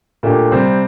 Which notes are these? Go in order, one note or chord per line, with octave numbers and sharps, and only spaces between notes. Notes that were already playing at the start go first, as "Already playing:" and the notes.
A#2 A3 D4 G4
C3 G3 C4